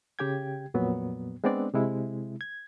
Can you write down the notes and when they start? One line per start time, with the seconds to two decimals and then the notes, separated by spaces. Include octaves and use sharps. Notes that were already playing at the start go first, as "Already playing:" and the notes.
0.19 C#3 G4 G5 G#6
0.74 F2 A#2 F#3 B3
1.44 G#3 B3 C4 D4 D5
1.74 C3 G#3 E4
2.41 G#6